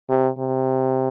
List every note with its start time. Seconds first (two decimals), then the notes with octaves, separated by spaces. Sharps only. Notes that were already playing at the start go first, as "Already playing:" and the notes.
0.09 C3
0.38 C3